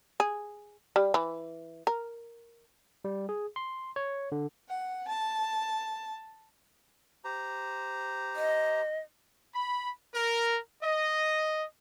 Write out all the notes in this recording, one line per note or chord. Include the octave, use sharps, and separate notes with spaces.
G#4
G3
E3
A#4
G3
G#4
C6
C#5
D3
F#5
A5
G4 C5 A#5
D#5
B5
A#4
D#5